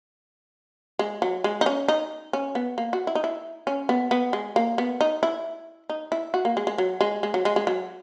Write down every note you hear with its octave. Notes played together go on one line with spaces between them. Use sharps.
G#3
F#3
G#3
D#4
C#4
D#4
C#4
B3
A#3
F#4
E4
D#4
E4
C#4
B3
B3
G#3
A#3
B3
D#4
E4
D#4
E4
F#4
A#3
G#3
G#3
F#3
G#3
G#3
F#3
G#3
G#3
F#3